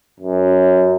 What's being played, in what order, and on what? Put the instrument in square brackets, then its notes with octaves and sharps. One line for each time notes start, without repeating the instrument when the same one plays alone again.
[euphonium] F#2